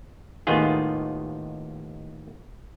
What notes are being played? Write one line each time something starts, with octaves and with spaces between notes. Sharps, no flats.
D#2 A2 D#3 B3 F4 G#4